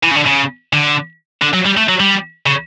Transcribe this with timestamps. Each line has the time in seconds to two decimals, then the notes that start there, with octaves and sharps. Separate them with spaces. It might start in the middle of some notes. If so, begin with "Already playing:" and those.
0.03 E3
0.11 C#3
0.15 D3
0.26 C#3
0.73 D3
1.42 D3
1.53 F#3
1.65 G3
1.77 A3
1.89 F#3
2.00 G3
2.46 C#3